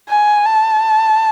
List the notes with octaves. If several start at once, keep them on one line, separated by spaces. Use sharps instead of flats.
G#5
A5